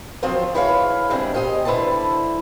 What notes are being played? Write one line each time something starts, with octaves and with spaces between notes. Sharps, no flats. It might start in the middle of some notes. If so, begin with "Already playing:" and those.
F3 F#3 C4 F4 C5 C#5
E4 G#4 B4 C#5 D#5 F5
E2 G3 G#3 C4 D4
G4 C5 D#5 E5 G#5
D3 E4 B4 C5 D5 A5